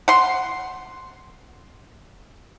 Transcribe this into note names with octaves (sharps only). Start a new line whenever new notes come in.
F#5 C6